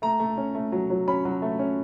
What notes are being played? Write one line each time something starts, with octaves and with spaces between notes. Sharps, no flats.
A3 A#5
A3
C#4
A3
F#3
F#3
C#4 B5
F#3
A3
C#4